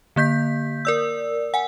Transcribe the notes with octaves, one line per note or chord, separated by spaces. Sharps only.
D3 A#3 G6 B6
A#4 D5 E6
F#5 G#5